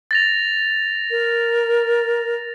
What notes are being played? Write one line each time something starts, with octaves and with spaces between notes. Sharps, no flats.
A6 A#6 F7
A#4